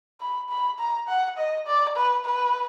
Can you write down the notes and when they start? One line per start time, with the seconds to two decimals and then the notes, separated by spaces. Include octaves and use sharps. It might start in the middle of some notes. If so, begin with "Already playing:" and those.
0.20 B5
0.49 B5
0.79 A#5
1.08 F#5
1.38 D#5
1.67 D5
1.96 B4
2.25 B4